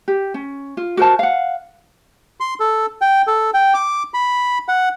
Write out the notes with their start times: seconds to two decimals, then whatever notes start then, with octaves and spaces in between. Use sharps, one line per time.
0.08 G4
0.34 C#4
0.77 F4
0.97 F#4 A#4 C5 A5
1.19 F5 F#5
2.40 C6
2.60 A4
3.01 G5
3.27 A4
3.54 G5
3.74 D6
4.14 B5
4.68 F#5